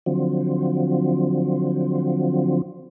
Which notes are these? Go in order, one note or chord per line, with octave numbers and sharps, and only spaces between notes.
D3 F3 F#3 C4